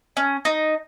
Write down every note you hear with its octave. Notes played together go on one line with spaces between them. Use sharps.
C#4
D#4